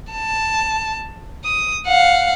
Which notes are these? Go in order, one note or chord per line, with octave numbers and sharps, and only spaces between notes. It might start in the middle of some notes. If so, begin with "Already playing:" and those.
A5
D#6
F5 F#5